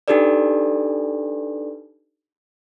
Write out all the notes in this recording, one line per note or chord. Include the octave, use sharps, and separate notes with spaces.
D4 D#4 G4 A4 B4 D5